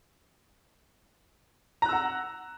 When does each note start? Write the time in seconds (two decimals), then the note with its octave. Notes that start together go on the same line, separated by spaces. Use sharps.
1.82 A#5
1.86 F#6
1.89 E6
1.92 F#5